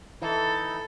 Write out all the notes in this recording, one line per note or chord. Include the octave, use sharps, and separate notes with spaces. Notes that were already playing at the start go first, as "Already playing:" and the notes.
E3 D#4 E4 A4